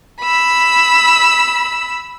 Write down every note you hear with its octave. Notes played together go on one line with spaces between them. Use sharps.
B5 E6